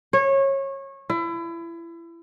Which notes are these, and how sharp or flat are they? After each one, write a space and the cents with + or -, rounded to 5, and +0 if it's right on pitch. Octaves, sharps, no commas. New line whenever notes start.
C#5 -25
E4 +30